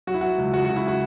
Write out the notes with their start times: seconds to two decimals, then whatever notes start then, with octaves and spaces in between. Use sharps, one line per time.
0.07 F#3 F#4
0.14 E4
0.21 F#3 F#4
0.38 C#2
0.53 C#2 F#4
0.65 F#4
0.69 C#3
0.76 E4
0.88 F#4